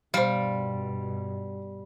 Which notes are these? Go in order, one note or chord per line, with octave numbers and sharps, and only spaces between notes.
G2 B2 G3 C5 F5